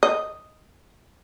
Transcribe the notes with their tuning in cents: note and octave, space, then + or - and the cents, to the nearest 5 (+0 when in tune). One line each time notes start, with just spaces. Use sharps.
D#5 +0